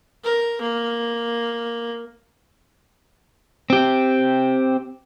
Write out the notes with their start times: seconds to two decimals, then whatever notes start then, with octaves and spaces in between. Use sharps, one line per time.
0.24 A#4
0.61 A#3
3.70 C4 G4